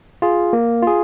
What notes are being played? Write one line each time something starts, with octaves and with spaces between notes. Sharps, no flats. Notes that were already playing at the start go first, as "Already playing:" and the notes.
F4 G#4
A#3
F4 G#4